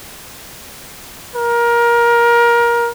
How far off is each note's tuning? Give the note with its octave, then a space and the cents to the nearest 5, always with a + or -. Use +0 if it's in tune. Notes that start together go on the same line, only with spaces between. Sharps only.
A#4 +20